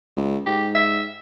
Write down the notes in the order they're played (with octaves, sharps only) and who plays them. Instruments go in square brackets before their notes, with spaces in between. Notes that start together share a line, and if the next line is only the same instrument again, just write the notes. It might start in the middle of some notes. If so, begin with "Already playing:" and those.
[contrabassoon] C#2
[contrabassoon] G#2 [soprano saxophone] G4
[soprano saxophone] E5